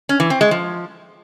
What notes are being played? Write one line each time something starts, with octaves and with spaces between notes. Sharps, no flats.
C#4
E3
C4
G#3
F3